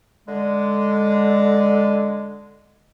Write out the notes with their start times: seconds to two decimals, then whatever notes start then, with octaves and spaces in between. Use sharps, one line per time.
0.28 D3 G#3